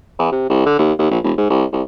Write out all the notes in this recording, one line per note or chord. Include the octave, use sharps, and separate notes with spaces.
E2
C3
C2
D3
D#2
D#2
A#1
E1
G#2
C2
C2